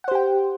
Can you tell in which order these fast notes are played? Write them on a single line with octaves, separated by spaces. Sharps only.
F#5 C5 G4 G5